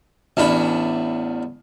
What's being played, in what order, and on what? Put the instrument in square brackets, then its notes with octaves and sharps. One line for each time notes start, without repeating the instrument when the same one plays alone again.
[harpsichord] A1 E2 D4 B5